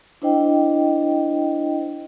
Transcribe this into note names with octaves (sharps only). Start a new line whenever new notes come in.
D4 E4 C5 D#5 G5